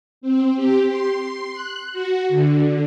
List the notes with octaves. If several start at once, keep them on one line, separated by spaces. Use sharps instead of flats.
C4
G4
C6
F#6
F#4
D3